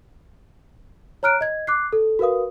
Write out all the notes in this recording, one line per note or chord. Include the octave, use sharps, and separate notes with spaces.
C#5 A#5 F6 F#6 D7
D#5 G#6
D6 F#6 C7
A4
F#4 A#4 B4 F5 D#6